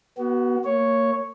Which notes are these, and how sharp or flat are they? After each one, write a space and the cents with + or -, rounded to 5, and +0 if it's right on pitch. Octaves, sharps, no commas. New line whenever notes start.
B3 -25 F#4 +25
A#3 -25 C#5 +0